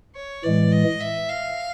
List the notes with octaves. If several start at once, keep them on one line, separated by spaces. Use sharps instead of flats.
C#5
A2 E3 G#3 D5
D#5
E5
F5